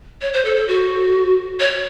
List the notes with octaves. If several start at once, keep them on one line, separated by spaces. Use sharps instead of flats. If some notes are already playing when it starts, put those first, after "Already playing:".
C#5
C5
A4
A4
F#4
C#5